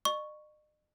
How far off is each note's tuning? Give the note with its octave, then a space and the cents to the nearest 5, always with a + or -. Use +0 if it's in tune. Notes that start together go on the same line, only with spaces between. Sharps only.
D#5 -45 C#6 +0